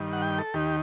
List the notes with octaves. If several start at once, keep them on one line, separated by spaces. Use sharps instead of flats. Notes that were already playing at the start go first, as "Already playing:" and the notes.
Already playing: G2 D#3
F#5
G5
A4
D#2 D#3 G4